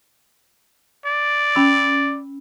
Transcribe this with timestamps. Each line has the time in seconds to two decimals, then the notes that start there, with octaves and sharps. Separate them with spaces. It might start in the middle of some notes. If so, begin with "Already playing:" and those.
1.06 D5
1.55 C#4 B5 E6